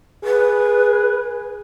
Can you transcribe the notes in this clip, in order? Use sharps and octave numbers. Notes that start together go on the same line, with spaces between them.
G#4 B4